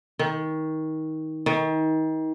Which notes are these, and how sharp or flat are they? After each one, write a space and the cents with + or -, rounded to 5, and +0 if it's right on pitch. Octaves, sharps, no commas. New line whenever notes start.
D#3 +20
D#3 +30